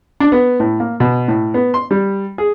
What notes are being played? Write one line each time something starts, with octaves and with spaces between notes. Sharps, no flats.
D4
B3
A2
A#3
B2
A2
B3
C6
G3
G#4